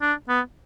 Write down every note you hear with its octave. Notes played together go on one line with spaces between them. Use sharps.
D4
B3